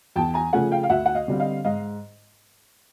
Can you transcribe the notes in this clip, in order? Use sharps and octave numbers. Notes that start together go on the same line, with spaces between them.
E2 G5 A5
G#5 A#5
C#3 F3 A3 C#4 F#5 G#5
F5 G5
F5
D2 E5 F#5
F#5
D#5 F5
D3 G3 C4
D#5 F5
G#2 D#5 F5